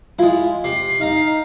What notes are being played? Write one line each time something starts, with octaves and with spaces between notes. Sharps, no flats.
G#3 E4 F4
C3 C7
D#4 F5 A#5